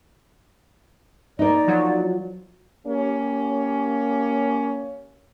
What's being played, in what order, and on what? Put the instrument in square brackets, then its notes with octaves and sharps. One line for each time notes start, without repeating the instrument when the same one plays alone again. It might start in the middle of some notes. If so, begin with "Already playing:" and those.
[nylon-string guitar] A#3 D#4 [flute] D5
[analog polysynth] F3 F#3
[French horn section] A#3 C#4 G4